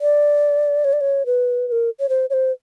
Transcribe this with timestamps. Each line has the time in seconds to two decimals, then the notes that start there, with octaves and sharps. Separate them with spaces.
0.01 D5
0.85 C#5
0.93 D5
1.01 C#5
1.26 B4
1.68 B4
1.72 A#4
2.00 C#5
2.09 C5
2.30 C#5
2.33 C5